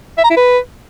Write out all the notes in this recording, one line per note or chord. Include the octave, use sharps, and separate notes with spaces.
E5
A#5
E4
B4